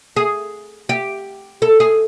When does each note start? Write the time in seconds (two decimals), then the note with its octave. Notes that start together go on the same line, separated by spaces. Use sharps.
0.16 G#4
0.89 G4
1.62 A4
1.80 G#4